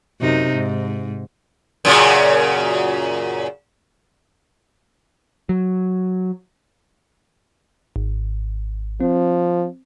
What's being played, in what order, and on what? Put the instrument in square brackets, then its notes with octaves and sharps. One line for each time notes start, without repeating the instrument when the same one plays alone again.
[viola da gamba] F#2 C3 D#4
G#2
[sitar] F#2 A#2 C#3
[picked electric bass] F#3
[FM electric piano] G#1
[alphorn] F3 [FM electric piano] C4